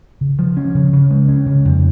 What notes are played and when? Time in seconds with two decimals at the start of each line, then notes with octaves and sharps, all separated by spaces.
0.21 C#3
0.39 F3
0.57 C#4
0.75 C#3
0.93 C#3
1.11 G#3
1.28 C#4
1.46 C#3
1.65 F2